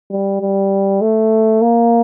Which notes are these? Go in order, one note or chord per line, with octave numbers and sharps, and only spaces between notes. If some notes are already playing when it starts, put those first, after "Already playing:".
G3
G3
A3
A#3